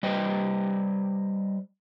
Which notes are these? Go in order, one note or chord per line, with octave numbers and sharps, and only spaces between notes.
G3 B4 C5 D#5 G5